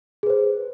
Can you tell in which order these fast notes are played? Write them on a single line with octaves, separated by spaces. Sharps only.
G#4 B4 C5